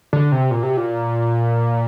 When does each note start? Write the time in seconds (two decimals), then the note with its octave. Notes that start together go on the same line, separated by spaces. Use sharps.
0.13 D3
0.32 C3
0.51 A#2
0.63 C3
0.77 A#2